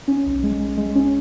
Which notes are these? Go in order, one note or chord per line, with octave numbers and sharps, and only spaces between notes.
C#4
B1
G#3
G#3
G#3
C#4